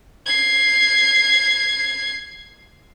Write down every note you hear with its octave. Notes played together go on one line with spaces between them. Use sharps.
G#6 C7